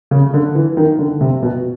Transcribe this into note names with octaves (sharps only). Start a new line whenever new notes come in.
C#3
D3
E3
D#3
D3
C3
B2